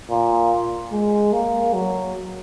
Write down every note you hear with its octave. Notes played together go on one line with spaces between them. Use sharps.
A#2
G#3
A#3
F#3